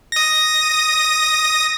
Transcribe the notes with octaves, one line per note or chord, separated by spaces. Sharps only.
D#6 A#6